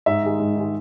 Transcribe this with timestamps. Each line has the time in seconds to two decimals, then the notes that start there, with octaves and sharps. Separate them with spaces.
0.06 G#2 E5
0.23 D#3 G#3
0.40 G#2
0.56 D#3 G#3